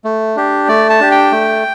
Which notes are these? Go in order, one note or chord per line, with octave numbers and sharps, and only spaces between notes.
A3
D4 G4
A3 D5
A5
D4 G4
G5
A3